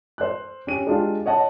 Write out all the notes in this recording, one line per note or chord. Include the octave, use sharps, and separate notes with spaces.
C5 F#6
C#4 G4 D#7
G#3 D4 F4 G4
C#5 D#5 F#5 A5